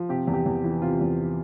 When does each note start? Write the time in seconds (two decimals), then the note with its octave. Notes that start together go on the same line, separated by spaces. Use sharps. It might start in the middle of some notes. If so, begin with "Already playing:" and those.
Already playing: F3
0.09 C3 G4
0.27 E2
0.33 G4
0.46 E2
0.64 E3
0.82 C3 F4
1.01 E2